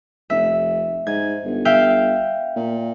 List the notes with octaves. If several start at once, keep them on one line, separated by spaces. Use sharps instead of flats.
F1 E5
G#2 G#6
G1
E5 F5 G5
A#2